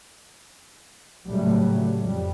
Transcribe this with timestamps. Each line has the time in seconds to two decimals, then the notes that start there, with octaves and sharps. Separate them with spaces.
1.28 A2 C#3 F#3 G3 A3
1.98 F2 G3